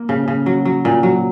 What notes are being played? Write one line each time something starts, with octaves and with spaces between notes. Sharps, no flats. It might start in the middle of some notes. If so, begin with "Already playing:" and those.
Already playing: A#3
C#3
C#3
F#3
F#3
A#2
F#3